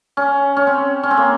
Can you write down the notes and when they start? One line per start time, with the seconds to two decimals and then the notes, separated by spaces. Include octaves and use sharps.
0.17 C#4
0.57 C#4
0.67 C4
1.03 C#4
1.11 C4
1.17 A#3